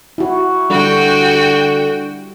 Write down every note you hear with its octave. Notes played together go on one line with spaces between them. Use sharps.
E4 F#4
D3 G3 F#4 G5